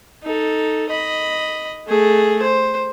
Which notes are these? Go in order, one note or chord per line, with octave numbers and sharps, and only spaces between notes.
D#4 A4
D#5 B5
A3 G#4
C5